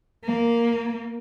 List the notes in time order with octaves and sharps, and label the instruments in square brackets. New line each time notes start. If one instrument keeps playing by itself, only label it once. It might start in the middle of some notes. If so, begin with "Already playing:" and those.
[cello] A#3